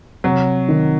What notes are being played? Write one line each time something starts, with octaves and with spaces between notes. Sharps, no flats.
C3 F#3
D#3